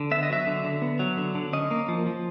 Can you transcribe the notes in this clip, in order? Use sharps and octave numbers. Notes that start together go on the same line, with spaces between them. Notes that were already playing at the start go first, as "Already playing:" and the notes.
Already playing: D3
B3 E5
D#5
F#3 E5
D3
D3
B3
F#3
D3
D3
C#4 D#5
A#3
F3
F3